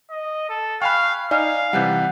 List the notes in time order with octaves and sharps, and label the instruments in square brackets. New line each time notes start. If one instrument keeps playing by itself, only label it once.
[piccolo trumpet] D#5
A4
[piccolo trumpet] F5 [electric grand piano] G5 G#5 B5 [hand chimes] C#6 F#6
[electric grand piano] D#4 [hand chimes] D5 G#5 [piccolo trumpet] F5
[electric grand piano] C3 E3 G3 [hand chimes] F#5 F#6 G6